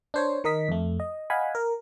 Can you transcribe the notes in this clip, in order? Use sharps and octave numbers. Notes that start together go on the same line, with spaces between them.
D4 C5 C#5
D#3 A#4 D#5 B6
F2 A3
D#5
D#5 F5 F#5 G#5 B5
A#4